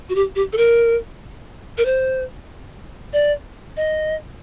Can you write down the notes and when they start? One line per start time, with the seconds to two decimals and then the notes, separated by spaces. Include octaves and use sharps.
0.09 F#4
0.15 G4
0.36 G4
0.53 A4
0.57 A#4
1.78 A#4
1.85 C5
3.13 D5
3.77 D#5